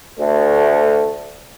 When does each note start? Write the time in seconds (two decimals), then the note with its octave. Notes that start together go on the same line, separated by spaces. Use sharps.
0.20 D2 A3